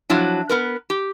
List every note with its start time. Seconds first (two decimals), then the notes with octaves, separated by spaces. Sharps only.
0.10 F3 F#3 D4 E4
0.49 B3 A#4 B4
0.90 G4